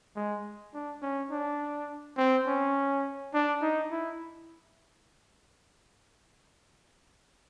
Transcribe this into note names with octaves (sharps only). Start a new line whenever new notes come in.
G#3
D4
C#4
D4
C4
C#4
D4
D#4
E4